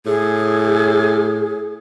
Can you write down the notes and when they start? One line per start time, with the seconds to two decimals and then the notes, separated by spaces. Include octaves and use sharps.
0.06 A2 G#4